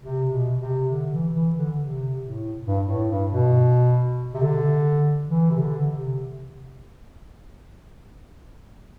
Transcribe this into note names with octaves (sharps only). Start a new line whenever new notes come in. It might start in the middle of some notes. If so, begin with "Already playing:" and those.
C3
B2
C3
D3
E3
E3
D3
C3
A2
G2
A2
G2
B2
C3
D3
E3
C3
D3
C3